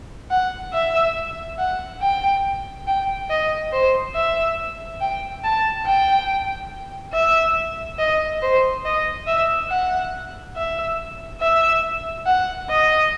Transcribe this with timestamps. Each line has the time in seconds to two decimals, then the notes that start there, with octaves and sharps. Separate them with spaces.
0.31 F#5
0.73 E5
1.58 F#5
2.02 G5
2.87 G5
3.30 D#5
3.72 C5
4.15 E5
5.01 G5
5.44 A5
5.86 G5
7.13 E5
7.99 D#5
8.42 C5
8.85 D#5
9.28 E5
9.70 F#5
10.56 E5
11.41 E5
12.26 F#5
12.70 D#5